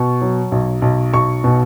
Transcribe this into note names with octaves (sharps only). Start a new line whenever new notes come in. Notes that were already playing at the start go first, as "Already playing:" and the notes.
Already playing: B2 C#6
F#3
B1
B1
B1 C#6
B2